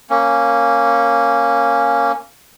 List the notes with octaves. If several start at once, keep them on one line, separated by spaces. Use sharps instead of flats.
A#3 C#4